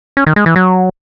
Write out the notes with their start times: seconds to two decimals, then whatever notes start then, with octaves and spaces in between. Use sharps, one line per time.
0.17 C#4
0.27 D#3
0.36 G#3
0.46 E3
0.56 F#3